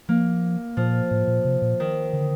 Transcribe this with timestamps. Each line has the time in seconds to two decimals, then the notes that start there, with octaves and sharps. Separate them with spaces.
0.09 F3 A#3
0.77 A#2 F3
1.11 A2
1.28 A#2
1.45 C3
1.62 A#2
1.80 D#3
2.13 D3